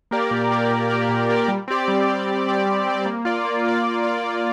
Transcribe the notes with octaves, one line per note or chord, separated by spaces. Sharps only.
A#3 G4 A#4 D5
A#2
A#3 G4 A#4 D5
A#2
A#3 G4 A#4 D5
A#2
A#3 G4 A#4 D5
G3
C4 G4 D5
G3
C4 G4 D5
G3
C4 G4 D5
G3
C4 G4 D5
A#3
F4 D5
A#3
F4 D5
A#3
F4 D5
A#3